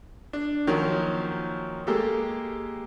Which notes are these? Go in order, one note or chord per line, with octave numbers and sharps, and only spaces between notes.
D4
D#3 F3 F#3 A#3 C#4
G#3 A#3 G4 A4